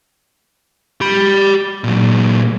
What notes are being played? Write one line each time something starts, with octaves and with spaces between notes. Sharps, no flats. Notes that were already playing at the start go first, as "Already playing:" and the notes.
G4 B5
A#2 F#3